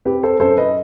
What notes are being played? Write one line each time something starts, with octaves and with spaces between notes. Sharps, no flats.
C4 G4 B4
A4 C5
F#2 A4 C5
B4 D#5